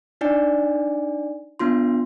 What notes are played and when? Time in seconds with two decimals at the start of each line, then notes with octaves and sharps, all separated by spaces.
0.21 D4 D#4 D5 G#5
1.59 B3 D4 F4 C6